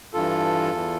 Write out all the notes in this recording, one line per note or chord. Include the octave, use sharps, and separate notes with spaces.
G2 E3 F4 A4
E2 E3